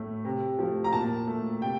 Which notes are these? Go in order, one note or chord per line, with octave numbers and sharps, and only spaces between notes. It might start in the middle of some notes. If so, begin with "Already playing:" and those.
Already playing: A2 A3
C3
F3 A3
A#5
A#2 A5
A3
C3 G5